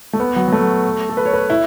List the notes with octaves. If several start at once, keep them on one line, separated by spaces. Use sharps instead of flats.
A3
B3
F#3
F#3
A3
A4
B4
C#5
B4
E4